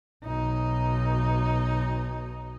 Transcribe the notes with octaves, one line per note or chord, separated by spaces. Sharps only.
B1 D#4